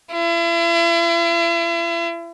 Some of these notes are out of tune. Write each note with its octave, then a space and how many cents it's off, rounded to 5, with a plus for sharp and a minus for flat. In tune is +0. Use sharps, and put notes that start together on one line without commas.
E4 +40